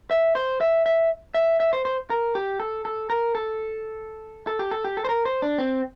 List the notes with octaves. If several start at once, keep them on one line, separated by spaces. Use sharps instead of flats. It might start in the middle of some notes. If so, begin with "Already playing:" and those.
E5
C5
E5
E5
E5
E5
C5
C5
A#4
G4
A4
A4
A#4
A4
A4
G4
A4
G4
A4
C5
A#4
C5
D4
C4